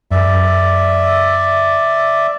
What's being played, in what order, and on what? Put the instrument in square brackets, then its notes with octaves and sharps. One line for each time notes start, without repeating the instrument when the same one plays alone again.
[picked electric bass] F#2 [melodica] D5 E5